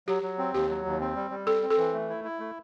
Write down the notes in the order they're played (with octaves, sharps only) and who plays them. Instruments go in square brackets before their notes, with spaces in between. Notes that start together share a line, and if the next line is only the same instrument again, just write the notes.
[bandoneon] F#3 [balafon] G4
[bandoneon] F#3
C4
[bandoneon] D#2 [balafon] G4
[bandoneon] F#3
D#2
C4
G3
G3
[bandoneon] C4 [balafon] A4
[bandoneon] C4
[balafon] A4
[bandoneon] E3
A3
E4
E4
A3